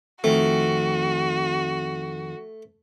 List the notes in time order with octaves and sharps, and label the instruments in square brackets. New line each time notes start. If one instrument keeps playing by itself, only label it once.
[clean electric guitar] F2 D#3 C4 [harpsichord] A3 [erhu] F#4